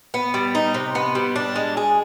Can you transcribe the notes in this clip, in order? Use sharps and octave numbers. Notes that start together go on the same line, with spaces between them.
B3
G3
D#4
C3
B3
G3
D4
G#3
G#4